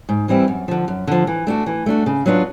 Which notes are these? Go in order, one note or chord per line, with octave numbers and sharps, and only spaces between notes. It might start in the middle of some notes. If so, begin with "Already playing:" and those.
G#2
E3 G3 C4 E4
F#2
D3 F3
F#2
D3 F3
E3
A3 D4 F#4
E3
A3 D4 F#4
C#3
F#3 B3 D4 F4